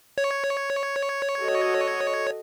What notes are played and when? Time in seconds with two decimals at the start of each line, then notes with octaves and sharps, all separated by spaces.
0.18 C#5
1.40 F#4 A4 D#5